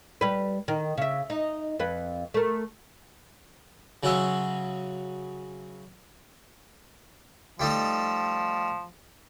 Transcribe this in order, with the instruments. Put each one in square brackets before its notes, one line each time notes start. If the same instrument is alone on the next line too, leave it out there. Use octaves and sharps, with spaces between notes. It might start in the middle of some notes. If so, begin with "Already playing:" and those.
[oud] G3 B4
D#3
C#3 E5
D#4
F2 B4
A3 A#4
[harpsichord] C#3 F#3 C#4 F#4 E5 C6
[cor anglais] F3 [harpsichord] G3 A3 D#4